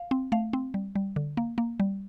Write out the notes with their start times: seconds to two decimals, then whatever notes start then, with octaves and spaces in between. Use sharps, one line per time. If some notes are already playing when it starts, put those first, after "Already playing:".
Already playing: F5
0.11 C4
0.32 A3 F5
0.53 C4
0.74 G3
0.95 G3
1.16 D3
1.37 A#3
1.58 A#3
1.80 G3